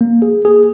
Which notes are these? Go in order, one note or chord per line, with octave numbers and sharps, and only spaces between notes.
A#3
G#4
G#4